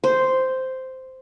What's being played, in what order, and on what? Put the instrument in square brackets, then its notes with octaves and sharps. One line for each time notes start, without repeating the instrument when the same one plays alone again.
[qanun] C5